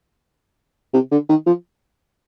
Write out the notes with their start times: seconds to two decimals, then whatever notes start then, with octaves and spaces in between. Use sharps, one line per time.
0.94 C3
1.12 D3
1.29 D#3
1.47 F3